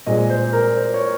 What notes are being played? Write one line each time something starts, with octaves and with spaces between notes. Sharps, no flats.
A#2 G#3 C4 D#5
C5
A#4
C5
C#5